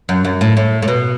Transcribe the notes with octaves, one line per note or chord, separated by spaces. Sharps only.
F#2
F#2
A2
A2
A2
B2